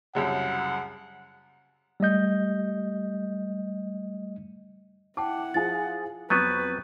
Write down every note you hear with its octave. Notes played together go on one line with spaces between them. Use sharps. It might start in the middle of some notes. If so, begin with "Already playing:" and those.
C2 F#2 C#3 F#5
G3 A3 D#5 G6
E4 F#5 G5 A5 D6
F3 F4 G#4 A6
F2 F#3 B3 B4 C#6 G6 A6 D#7